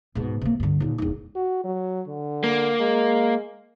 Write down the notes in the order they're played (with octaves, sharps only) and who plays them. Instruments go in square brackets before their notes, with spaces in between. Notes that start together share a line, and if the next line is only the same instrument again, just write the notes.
[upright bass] G#2 B2
C3 A#3
G2 D3
D#2 A#2
E1 D#4
[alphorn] F#4
F#3
D3
[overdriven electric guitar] A#3
[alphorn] G#3